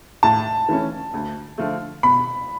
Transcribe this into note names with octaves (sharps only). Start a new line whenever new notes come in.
A2 A5
E3 A3 C#4
D2
D3 F3 A3
B2 B5